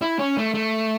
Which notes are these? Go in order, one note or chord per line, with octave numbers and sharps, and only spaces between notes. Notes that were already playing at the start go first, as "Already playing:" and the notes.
E4
C#4
A3
A3